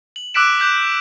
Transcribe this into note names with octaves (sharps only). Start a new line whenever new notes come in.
F#7
D6 E6 F#6 B6 D7 E7
D6 F#6 G6 B6 F#7